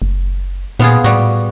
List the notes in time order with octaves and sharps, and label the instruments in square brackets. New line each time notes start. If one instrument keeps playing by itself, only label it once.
[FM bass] F#1
[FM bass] A#2 [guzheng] B3 F4 G#4
[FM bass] A2 [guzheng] G3 F#4